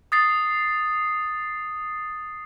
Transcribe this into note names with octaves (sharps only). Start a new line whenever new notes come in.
D#6 A6 C7